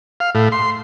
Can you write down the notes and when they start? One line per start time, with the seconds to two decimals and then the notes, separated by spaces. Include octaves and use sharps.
0.20 F5
0.35 A2
0.52 C6